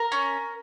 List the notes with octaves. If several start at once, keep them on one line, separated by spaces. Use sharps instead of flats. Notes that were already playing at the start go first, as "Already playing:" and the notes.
Already playing: A#4
C#4